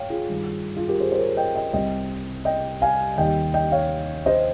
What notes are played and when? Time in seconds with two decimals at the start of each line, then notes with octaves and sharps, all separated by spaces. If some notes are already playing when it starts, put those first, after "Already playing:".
Already playing: G#2 C#5 F5 G5
0.10 F4 G#4
0.29 G2 D#3 G3
0.76 F4 G#4
0.88 G4 A#4
1.00 G#4 C5
1.12 C5
1.18 A#4 C#5
1.37 D#5 G5
1.55 D#5 G5
1.73 C2 C3 G3 D#5 G5
2.45 D#5 G5
2.82 F5 G#5
3.18 D#2 D#3 G3 D#5 G5
3.54 D#5 G5
3.72 C#5 F5
4.26 C5 D#5